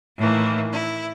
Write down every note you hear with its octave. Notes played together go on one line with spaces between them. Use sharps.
A2 D#3 E3 A#3
E4